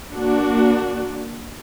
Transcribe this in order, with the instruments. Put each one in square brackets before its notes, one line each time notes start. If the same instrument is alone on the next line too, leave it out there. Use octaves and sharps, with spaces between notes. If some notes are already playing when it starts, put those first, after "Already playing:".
[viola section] A#3 D4 F#4